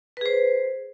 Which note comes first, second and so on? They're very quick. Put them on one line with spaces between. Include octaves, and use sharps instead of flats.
B4 G#4 C5